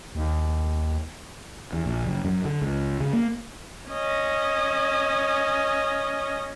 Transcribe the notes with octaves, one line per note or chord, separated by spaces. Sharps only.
D#2
E2
A#1
F#1
F#2
D3
C#2
C#3
A#3
C#4 D#5